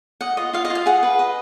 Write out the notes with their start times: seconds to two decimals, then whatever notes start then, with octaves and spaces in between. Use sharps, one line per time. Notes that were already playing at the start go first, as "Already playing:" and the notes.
0.21 D#5 F#5
0.37 F4 D#5
0.53 F4 F5
0.65 D#5
0.70 F4
0.75 F5
0.86 G#4 F#5
1.03 B4
1.19 D#5